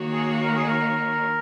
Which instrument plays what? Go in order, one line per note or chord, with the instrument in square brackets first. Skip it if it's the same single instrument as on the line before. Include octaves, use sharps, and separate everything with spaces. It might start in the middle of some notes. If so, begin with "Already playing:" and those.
Already playing: [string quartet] D#3 A#3 F#4 C#5
[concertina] G#4
A#4
G#4
A#4